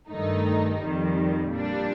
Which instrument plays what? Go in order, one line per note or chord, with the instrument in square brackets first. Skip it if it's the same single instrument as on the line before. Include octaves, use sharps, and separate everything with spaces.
[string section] G2 D#3 A3 D#4
F2 D#3 G3
A#2 G3 D4